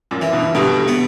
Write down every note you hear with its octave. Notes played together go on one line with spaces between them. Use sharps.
F#2 A#2
E3
G2 B2
G2 B2 D3
B3